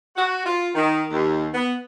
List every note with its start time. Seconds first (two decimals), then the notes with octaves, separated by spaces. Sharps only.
0.16 F#4
0.46 F4
0.75 D#3
1.10 D#2
1.54 B3